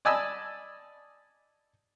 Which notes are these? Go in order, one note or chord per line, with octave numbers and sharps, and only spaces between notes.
D5 D#5 G#5 A5 B5 E6